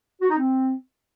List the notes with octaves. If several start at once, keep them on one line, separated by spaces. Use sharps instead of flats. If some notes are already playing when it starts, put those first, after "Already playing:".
F#4
D#4
C4